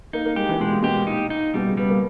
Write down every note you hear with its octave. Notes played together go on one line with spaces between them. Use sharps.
A#3 D#4
A#3
G#3 G4
E3
B2 G#3
A#2
B2 G4
A#2 D#4
D#4
B2 G3
C#3
G3 B3
A#3